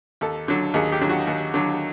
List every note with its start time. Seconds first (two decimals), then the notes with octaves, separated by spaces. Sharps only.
0.21 D#2 A4
0.48 D3 F#3
0.74 D#2 G#4
0.92 G4
1.01 D3 F#3
1.09 F#4
1.27 D#2
1.54 D3 F#3